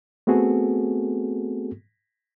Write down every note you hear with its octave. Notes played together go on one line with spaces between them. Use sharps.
A3 B3 C4 F#4 G#4 A4